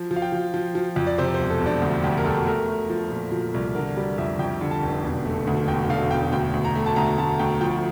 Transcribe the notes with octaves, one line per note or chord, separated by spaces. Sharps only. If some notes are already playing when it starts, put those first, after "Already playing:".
Already playing: F3
F3
F5
G5
F3
F3
F3
F2
D5
C3 C5
C5
E1
A4
E1
D4
D2
D2 G4
A#4
E1 A4
A3 A#4
A3
F3
A#2
F3
C2
D3 A#4
G3 D5
F2 E5
F2 G5
D3
A5
F1
E1
A3
D2
E1 G5
D3 F5
E1 G5
D2 G5
D2
A#5
A3
A5
D2 A#5
D2 A5
D2 G5
F3 G5